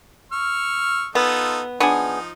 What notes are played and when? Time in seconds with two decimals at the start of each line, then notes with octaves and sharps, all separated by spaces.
0.32 C#6 E6 F6
1.15 B3 D#4 F4 A4
1.80 F3 B3 D4 D#4 G#4